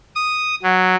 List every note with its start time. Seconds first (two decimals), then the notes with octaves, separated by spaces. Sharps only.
0.15 D#6
0.63 F#3